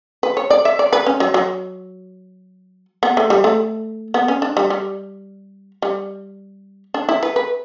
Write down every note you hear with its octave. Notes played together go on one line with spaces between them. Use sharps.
B4
C#5
D5
E5
D5
B4
C#4
F#3
F#3
B3
A3
G3
A3
B3
C#4
D4
G3
G3
G3
D4
E4
B4
B4